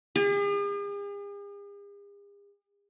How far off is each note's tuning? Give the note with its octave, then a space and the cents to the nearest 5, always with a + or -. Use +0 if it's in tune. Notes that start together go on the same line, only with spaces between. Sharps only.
G#4 -45